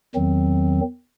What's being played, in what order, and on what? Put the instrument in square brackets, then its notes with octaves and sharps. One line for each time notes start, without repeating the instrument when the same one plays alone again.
[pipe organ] E2 D#3 F#3 C4